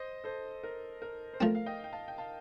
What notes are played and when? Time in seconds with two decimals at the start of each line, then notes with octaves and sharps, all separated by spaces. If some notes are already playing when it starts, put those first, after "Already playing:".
Already playing: C5 D#5
0.24 A4 C5
0.63 A#4
1.02 A#4
1.34 C5
1.41 F3 A3 C4 A#4
1.55 F5
1.66 D#5 G5
1.84 G5
1.93 F5 A5
2.08 G5
2.18 F5 A5